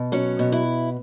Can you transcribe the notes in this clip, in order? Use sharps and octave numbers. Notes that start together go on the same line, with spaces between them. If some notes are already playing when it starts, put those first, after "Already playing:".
Already playing: B2
F#3 C#4
B2
E4